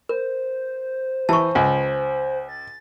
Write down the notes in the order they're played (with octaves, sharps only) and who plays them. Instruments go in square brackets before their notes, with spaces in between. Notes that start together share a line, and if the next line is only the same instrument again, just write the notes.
[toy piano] A#4 [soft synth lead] C5
[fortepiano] E3 [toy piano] A5 C#6
[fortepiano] C#2
[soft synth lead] A6